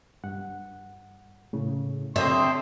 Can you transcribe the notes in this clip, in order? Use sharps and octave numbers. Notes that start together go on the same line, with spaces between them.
G2 F#5
A2 C#3
D3 C4 C#5 D#5 E5 C6